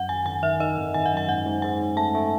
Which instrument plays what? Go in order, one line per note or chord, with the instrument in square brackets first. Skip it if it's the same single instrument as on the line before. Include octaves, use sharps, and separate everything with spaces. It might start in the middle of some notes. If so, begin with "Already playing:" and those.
Already playing: [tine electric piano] F#2 [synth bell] F#5
[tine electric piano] G#1 [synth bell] G#5
[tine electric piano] G#1 [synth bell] G#5
[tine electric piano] D#3 [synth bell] E5
[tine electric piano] D#3 [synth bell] D#5
[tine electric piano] G#1
[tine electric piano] G#1 [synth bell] G#5
[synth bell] F#5
[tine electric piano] F#2 [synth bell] G#5
[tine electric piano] G#2 [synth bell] F#5
[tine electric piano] G#2
[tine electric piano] G#2 [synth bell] G#5
[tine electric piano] C#4
[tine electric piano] A3 [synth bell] A5
[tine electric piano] A3